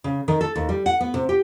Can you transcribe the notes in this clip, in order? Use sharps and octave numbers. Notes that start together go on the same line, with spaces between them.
C#3
D#3
A4
D#2
G3
F#5
B3
C3
G4